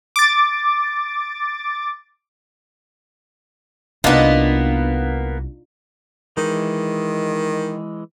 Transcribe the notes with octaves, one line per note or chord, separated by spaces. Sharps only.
D6 A6
C2 A#3 B3 D4 D#4 F4
D#3 E3 G#3